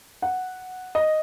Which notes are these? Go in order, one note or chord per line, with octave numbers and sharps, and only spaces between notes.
F#5
D#5